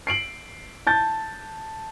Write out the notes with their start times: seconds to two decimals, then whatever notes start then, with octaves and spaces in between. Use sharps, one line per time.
0.07 C7 D7 F#7
0.87 A5 G6 A6